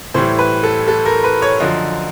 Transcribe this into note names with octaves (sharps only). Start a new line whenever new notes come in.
A2 E3 G3 C5
B4
A4
A4
A#4
B4
C#5
F#2 D3 F3 D#5